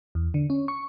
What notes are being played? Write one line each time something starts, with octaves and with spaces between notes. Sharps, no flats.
E2
D3
C#4
C#6